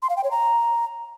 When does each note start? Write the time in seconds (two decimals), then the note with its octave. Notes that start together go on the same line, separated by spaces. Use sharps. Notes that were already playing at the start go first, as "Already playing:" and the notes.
0.02 C6
0.10 F5
0.17 G5
0.24 C#5
0.31 A#5